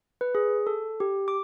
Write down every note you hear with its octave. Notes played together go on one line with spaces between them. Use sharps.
B4
G#4
A4
G4
D6